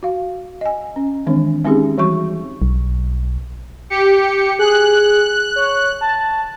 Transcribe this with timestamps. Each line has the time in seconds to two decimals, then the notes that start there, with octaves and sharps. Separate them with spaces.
0.03 F#4 F5
0.61 D#5 G#5
0.96 C#4
1.27 D#3 E3 G#3 C4 D4
1.65 G#3 C4 C#4 D#4 G4 G#4
1.98 E3 G3 F#4 C#6
2.62 B1
3.90 G4 C#7
4.59 G#4 F#6
5.56 C#5
6.01 A5